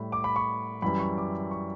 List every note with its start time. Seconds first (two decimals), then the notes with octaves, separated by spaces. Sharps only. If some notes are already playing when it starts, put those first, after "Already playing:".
Already playing: A2 G3 B5
0.12 D6
0.24 B5
0.36 C#6
0.82 F#2 E3 G3 B5
0.99 C#6
1.17 D6
1.51 C#6